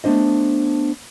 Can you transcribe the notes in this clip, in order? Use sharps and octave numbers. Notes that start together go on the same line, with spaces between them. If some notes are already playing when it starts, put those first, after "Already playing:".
A3 B3 D4 C5 D#5